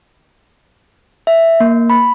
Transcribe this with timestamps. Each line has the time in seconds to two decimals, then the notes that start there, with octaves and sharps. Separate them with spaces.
1.27 E5
1.60 A#3
1.90 B5